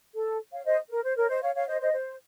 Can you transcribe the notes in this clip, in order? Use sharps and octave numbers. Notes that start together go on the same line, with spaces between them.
A4
C#5 F5
C5 D#5
A#4
C5
A#4 C#5
C5 D#5
C#5 F5
C#5 F5
C5 D#5
C5 D#5
C5